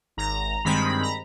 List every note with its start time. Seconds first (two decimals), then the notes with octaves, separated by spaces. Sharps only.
0.17 G#1 A#5
0.65 G2 D#3 G#3 C4 B5
1.02 A#5